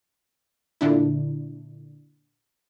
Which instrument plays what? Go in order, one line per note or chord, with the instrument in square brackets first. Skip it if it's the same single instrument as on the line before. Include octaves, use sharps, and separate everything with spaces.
[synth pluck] A#2 D3 D4 E4